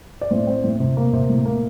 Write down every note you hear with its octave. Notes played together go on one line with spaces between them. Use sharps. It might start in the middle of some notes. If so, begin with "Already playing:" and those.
D5
A2 C4 C5
C4
A2
C3
A#3
C3
A2
A#3